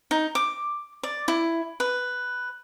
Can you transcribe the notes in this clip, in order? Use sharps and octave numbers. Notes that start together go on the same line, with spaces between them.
D#4
D6
D5
E4
B4